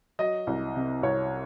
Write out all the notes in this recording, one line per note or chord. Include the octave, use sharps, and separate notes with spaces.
F#3 D#5
C2
C3
C2 C#5